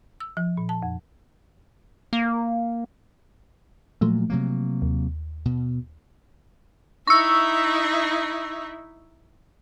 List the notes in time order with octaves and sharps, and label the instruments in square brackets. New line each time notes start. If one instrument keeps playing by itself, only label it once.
[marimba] E6
F3
A#2
A5
F2
[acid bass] A#3
[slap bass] A#2 F#3 [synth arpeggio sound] F3 A3
[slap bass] C3 F#3 A#3
[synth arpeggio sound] D#2
[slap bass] B2
[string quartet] D#4 E4 E5 [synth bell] C#6 E6